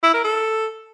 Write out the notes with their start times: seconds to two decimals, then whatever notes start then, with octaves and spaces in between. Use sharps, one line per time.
0.03 E4
0.14 A#4
0.24 A4